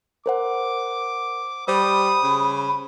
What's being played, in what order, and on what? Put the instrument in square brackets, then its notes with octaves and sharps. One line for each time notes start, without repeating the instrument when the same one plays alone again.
[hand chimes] A#4 C5 F#5 [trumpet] D6
[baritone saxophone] G3 [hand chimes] C5 [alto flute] B5 [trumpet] D#6
[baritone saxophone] C#3